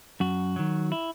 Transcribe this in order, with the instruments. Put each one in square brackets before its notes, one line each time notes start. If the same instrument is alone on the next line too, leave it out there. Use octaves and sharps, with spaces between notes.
[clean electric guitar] F#2 F#4
D#3 F#3
E4